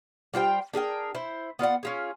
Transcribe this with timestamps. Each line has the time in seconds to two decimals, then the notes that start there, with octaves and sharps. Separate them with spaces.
0.34 G3 F4 C5 G5
0.74 D4 G#4 A#4 G5
1.15 E4 C5
1.59 B3 F4 D5 F#5
1.83 C#4 F4 G#4